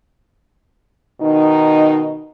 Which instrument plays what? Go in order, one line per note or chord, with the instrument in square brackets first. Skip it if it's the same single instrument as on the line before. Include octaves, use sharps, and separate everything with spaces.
[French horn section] B2 D#3 D#4